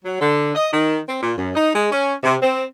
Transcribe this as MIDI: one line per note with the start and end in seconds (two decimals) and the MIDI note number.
0.05 0.19 54
0.21 0.54 50
0.55 0.68 75
0.73 0.99 51
1.09 1.20 60
1.23 1.34 46
1.38 1.52 42
1.56 1.70 63
1.75 1.88 56
1.91 2.15 61
2.23 2.36 48
2.42 2.64 60